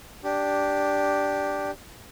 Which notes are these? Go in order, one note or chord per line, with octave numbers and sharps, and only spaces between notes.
D4 G4